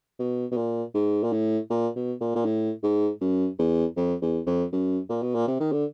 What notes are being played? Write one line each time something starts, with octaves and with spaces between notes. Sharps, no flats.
B2
B2
A#2
G#2
A#2
A2
A#2
B2
A#2
A#2
A2
G#2
F#2
E2
F2
E2
F2
F#2
A#2
B2
A#2
C3
D#3
D3